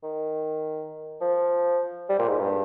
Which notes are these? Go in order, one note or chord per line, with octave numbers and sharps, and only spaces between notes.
D#3
F3
G3
A#2
G#2
G2